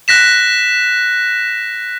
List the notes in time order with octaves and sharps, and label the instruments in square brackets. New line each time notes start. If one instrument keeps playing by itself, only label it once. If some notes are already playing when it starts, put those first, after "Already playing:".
[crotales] F#6 A#6 B6 E7